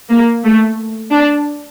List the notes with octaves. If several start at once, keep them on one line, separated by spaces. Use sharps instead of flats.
A#3
A3
D4